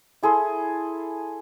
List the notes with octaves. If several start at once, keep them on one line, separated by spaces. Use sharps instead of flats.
E4 G#4 A4 C6